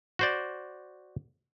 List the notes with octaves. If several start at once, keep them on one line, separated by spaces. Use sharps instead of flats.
F#4 C5 D5